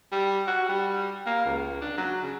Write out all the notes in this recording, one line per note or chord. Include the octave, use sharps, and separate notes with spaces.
G3
F#4
G3
A#3
C#2
D4
F#3
C#3